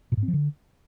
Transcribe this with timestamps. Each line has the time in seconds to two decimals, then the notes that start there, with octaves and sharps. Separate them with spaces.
0.12 A#2
0.17 G#2
0.23 C4
0.28 F3
0.33 D3